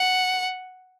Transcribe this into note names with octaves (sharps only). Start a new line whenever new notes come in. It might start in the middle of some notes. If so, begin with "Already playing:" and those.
Already playing: F#5